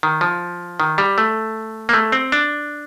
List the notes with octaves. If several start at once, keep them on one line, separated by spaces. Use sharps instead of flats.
D#3
F3
D#3
G3
A3
A#3
A3
C4
D4